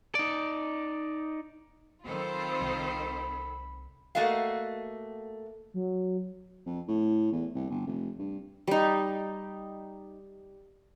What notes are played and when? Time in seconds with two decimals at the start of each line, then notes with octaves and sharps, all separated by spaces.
0.15 D#4 D5
2.05 D#3 F#3 C4 F4 A4 C5 B5
2.60 C2
4.15 A3 A#3 F#4 A4 D#5 F5
5.74 F#3
6.66 F2
6.88 A2
7.32 E2
7.55 C2
7.70 G1
7.87 F1
8.19 G2
8.67 G3 D#4